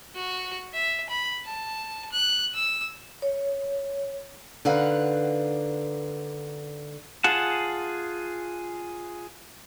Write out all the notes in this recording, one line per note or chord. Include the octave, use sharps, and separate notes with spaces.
F#4
E5
B5
A5
F#6
E6
C#5
D3 D#4 B4 F5 F#5
F4 G#4 F#5 A5